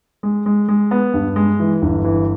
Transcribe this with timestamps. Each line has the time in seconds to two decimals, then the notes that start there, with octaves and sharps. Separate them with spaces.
0.23 G#3
0.46 G#3
0.68 G#3
0.91 B3
1.14 G2
1.36 G#3
1.60 E3
1.82 G1
2.04 E3